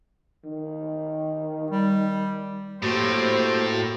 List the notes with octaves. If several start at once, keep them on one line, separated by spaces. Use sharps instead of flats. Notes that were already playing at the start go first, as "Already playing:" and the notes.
D#3
G3
A2 A#3 C4 F#4 G4 C5